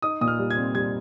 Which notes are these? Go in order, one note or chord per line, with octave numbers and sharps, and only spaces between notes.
D#4 D#6
A#2 D#6
F6
G3
G#6
C4
G3 G#6